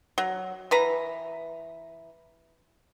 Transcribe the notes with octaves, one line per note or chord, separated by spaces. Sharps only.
F#3
E3 B4 A#5